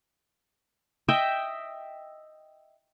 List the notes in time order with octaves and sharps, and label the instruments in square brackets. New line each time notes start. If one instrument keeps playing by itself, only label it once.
[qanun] D#5 E5 G5